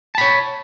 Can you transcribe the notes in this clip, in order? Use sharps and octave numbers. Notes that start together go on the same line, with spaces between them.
C#5 A5 B5